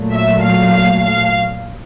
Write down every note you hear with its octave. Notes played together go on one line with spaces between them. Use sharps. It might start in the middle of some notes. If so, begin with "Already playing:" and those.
Already playing: A#2 F#3 A3
E5
F5
F5
F5